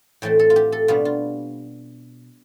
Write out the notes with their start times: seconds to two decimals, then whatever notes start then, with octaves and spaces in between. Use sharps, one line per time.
0.22 A2 E3 A3 C4 G5
0.39 A4
0.50 F4
0.56 G4
0.72 A4
0.88 B2 G3 B3 D4 F4
1.05 F4